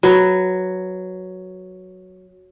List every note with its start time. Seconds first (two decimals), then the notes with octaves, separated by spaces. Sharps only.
0.03 F#3 B4